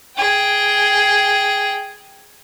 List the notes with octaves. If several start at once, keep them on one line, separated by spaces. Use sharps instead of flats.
G#4 G5